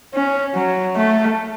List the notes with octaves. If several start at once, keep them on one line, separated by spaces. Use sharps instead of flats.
C#4
F#3
A3